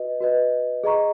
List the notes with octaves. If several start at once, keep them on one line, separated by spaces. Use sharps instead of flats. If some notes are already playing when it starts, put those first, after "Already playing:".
Already playing: F#4 B4 D#5
F#4 B4 D#5
G#4 D#5 A#5 C#6